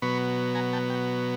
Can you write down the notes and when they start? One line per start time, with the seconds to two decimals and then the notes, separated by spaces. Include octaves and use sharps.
0.02 B2 F#3 B3 B5 C#6
0.55 G#5 A#5
0.73 G5 A5
0.90 G5